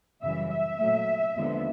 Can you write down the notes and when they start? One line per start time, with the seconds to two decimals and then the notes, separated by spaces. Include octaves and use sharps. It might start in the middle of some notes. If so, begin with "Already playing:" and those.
0.22 F#2 C#3 E3 G3 E5
0.51 E5
0.79 A#2 F#3 A3
1.36 D#2 D3 F3 G#3 B3